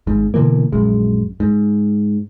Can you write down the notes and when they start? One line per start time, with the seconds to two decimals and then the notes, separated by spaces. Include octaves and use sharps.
0.07 G#1 G#2
0.34 B2 D3 E3 A#3
0.72 A#1 F#2 G#3
1.40 G#2